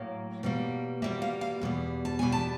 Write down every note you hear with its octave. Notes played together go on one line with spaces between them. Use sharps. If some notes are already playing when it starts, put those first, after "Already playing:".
Already playing: A2 F#3 A#3
B2 G3 A#3
B2 G3 A#3 E5
F5
F5
E2 B2 G3
A5
E2 B2 G3 G#5
A5